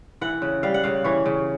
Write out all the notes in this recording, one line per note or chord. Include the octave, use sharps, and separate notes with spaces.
E3 F#5
C#3
G3 F5
F#5
C#3 F5
E3 C#5
C#3